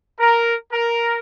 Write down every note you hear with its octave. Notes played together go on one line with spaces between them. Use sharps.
A#4
A#4